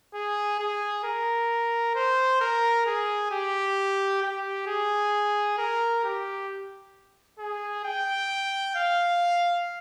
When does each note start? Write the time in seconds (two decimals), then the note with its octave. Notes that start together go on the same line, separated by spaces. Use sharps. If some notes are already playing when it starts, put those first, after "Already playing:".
0.14 G#4
0.60 G#4
1.04 A#4
1.95 C5
2.41 A#4
2.86 G#4
3.31 G4
4.23 G4
4.67 G#4
5.58 A#4
6.04 G4
7.39 G#4
7.85 G5
8.76 F5